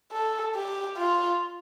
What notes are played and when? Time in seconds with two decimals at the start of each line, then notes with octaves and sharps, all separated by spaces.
0.12 A4
0.55 G4
0.97 F4